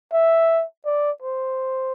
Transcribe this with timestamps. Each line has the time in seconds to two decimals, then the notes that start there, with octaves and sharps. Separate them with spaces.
0.13 E5
0.86 D5
1.22 C5